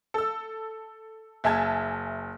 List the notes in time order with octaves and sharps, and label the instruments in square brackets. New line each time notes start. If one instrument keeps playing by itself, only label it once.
[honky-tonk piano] A4 E6
F#1 E5 G#5 A5 G#6